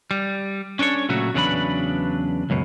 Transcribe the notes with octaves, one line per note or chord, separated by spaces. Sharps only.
G3
C#4 D4 A4 C#5
A#2 C#3 F#3 A3 F#4
E2 C#3 F#3 D4 B4 B5
C#2 F#2 B2